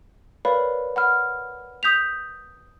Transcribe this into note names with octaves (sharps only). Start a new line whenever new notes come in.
A#4 B4 C#5 D5 F5 B5
F#5 B5 F6
D#6 G6 B6 F7